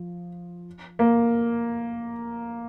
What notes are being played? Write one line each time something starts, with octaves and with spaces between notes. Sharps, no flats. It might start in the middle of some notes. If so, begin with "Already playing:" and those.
Already playing: F3
A#3